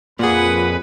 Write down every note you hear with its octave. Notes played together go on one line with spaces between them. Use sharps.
F2 A#2 G#4 B4 F#5